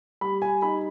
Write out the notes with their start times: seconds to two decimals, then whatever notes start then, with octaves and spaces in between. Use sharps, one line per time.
0.21 G3 B5
0.42 G#5
0.62 D#4 B5